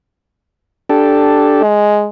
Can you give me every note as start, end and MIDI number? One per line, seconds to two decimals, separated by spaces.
0.89 1.62 62
0.89 1.62 67
0.89 1.62 69
1.62 2.08 56